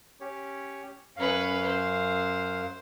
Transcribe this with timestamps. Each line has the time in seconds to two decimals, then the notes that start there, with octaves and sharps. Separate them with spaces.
0.21 C#4 G4 C#5
1.17 F#2 C#4 B4 F5
1.66 C5